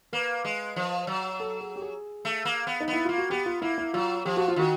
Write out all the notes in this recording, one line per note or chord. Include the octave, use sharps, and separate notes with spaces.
A#3 B4
G#3
F3
F#3
A4
G#4
G4
G#4
A3
A#3
B3
D#4
B3
E4
A#3 F4
F#4
B3 G4
F4
A#3 E4
E4
F#3 F4
F3 G4
F#4
F4
D#3 F#4